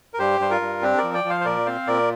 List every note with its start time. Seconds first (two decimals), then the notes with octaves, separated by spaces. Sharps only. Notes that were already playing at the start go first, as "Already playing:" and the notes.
0.14 A#4
0.19 G2 G4 C5
0.40 G2 C5
0.50 F4 A#4
0.61 G2
0.82 C4 D4 G4
0.98 A#4 D5
1.03 F3
1.14 D5 G5
1.24 F3
1.30 C5 F5
1.41 C5
1.45 A#2 A#4 D5
1.66 C4 C5 F5
1.87 A#2 A#4 D5